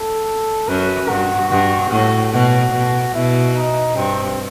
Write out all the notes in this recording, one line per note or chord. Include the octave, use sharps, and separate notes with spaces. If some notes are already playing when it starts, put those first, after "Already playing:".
Already playing: A4
F#2 B4
G2 F#4
G2 F#4
A2 F#4
B2 F#4
B2
B2 E4
D#4
G2 C4